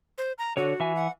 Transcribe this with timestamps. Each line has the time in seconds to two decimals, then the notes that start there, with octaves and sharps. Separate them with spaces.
0.18 C5
0.38 A#5
0.57 D3 F#4 C#5
0.80 E3 E5 G#5
0.96 F#5